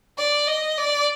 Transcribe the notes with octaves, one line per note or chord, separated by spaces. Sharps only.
D5
D#5
D5